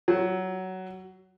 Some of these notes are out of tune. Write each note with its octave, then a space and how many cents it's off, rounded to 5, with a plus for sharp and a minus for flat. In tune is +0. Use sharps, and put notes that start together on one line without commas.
F#3 +15